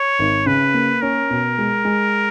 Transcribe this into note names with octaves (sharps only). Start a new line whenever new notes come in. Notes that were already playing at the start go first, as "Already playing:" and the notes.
Already playing: C#5
G#1
C#3 B4
A#3
C#4 A#4
B2
G#3
G#3